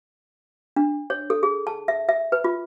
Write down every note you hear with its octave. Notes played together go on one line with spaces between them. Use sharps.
D4
C#5
A4
G#4
A5
E5
E5
B4
F4